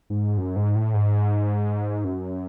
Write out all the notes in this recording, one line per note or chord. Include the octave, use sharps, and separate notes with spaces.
G#2
F#2
G#2
A2
G#2
F#2